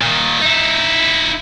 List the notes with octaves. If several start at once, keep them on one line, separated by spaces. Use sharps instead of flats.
A#2 D#3
D#4 E4